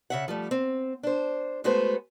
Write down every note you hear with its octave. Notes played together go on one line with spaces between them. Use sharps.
C#3 E5 F#5
F3 G3 A3
C4
D4 C5
G#3 A3 B3 F#4 B4 C5